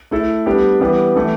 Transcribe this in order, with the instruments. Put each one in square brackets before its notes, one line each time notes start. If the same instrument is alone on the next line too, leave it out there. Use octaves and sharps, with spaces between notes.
[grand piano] A3 E4 A4
G3 B3 D4 G4
E3 G3 B3
E3 A3 E4